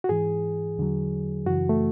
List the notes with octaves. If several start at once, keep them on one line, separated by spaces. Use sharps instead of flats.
F#4
G#2 E3 G#4
E2 D3 F#3
F#2 C#3 E3 F#4
A3